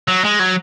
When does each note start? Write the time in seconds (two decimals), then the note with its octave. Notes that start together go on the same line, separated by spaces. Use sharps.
0.08 F#3
0.24 G#3
0.39 F#3